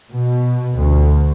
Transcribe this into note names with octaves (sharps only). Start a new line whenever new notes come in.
B2
D2